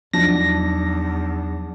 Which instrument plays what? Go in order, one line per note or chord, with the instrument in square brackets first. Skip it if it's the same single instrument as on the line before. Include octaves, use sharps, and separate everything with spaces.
[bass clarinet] E2 [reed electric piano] F3 F#3 D#4 [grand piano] D4 A5 [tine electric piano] A#6